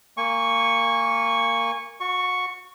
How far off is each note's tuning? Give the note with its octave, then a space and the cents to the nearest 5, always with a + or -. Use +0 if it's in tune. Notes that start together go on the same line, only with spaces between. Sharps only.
A#3 -15 G#5 -25 C#6 +0
F#4 -35 C#6 +0